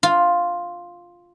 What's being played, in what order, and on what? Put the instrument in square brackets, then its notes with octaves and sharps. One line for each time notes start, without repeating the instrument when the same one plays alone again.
[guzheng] F4